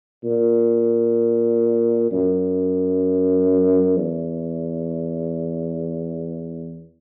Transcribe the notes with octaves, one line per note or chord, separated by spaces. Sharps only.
A#2
F#2
E2